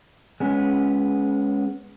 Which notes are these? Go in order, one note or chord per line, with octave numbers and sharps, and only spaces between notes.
G#3 B3 C#4